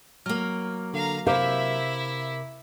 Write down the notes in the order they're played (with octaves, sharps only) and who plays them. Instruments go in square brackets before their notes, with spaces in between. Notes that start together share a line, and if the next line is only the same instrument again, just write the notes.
[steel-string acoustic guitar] F#3 A#3 [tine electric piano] F6
[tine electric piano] D3 [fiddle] F5 A#5
[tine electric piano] C3 A#4 D6 [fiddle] E4 E5 [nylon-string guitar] C5 F5